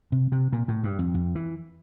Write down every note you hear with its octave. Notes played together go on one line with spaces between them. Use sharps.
C3
C3
A#2
A2
G2
F2
F2
E3